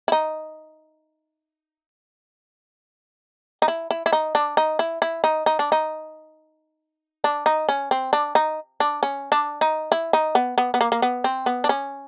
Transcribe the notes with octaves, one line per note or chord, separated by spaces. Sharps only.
E4
D#4
D#4
E4
E4
E4
D#4
D4
D#4
E4
E4
D#4
D#4
D4
D#4
D4
D#4
C#4
C4
D4
D#4
D4
C#4
D4
D#4
E4
D#4
B3
B3
B3
A#3
A#3
B3
C4
B3
D4
C#4